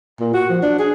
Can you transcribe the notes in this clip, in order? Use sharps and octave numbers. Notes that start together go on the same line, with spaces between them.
A#2
F#4
F3
D4
G#4